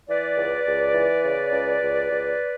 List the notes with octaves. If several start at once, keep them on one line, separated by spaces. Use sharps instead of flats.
E3 B4 D5
C#2
C#2
E3
C#3
C#2
C#2
C#2